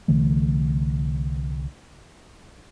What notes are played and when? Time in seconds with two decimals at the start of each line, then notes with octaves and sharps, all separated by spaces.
0.08 C2 D3 E3 A3